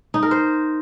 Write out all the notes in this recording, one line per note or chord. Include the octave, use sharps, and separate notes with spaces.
D#4
A#4
C5